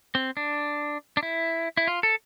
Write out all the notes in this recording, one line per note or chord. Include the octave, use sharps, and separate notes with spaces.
C4
D4
D4
E4
E4
F4
A4